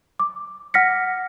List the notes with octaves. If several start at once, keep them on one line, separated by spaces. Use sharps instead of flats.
D6
F#5 F6 A#6 B6 C#7